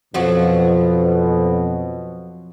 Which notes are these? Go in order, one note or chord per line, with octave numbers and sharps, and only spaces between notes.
F2 B2 F3 F#3 F#4